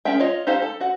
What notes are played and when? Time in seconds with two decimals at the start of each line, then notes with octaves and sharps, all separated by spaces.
0.05 C#4 G#4 A#4 E5 G5
0.20 F4 C#5 D#5
0.47 D#4 G4 A4 C5 F5
0.62 A4
0.80 F#4 F#5